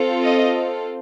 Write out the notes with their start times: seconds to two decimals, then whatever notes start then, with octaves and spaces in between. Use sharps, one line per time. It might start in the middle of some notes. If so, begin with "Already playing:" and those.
Already playing: C4 F4 A4
0.23 D#5